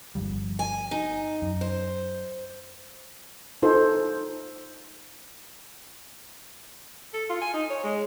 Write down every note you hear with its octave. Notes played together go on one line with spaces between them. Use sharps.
G1 F3 G3
G#5
D#4
F#2
C5
D#4 F4 A4 C5
A4
F4
G#5
D#4
C#5
G#3